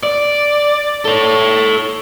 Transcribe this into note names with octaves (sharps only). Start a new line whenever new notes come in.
D5
A4 C#5